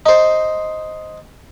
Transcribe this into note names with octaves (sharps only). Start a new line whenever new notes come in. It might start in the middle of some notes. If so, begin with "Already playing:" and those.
D#4 C5